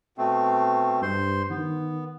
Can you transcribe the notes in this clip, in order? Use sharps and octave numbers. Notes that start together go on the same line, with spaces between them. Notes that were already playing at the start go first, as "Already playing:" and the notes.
B2 A3 C4
G2 C5 C6
D#3 B3